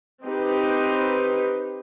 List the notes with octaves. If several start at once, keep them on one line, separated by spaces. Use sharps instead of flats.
C4 D#4 G4 B4